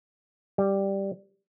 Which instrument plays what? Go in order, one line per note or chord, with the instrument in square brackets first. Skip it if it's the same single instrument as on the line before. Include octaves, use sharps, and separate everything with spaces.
[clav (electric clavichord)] G3